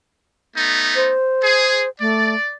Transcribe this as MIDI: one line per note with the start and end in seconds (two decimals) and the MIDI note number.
0.56 1.11 57
0.56 1.11 59
0.56 1.11 63
0.96 1.89 72
1.43 1.84 68
2.00 2.35 57
2.00 2.54 74